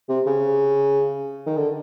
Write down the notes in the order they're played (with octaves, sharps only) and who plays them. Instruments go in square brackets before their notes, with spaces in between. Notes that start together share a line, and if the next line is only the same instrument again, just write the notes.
[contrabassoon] C3
C#3
D#3
D3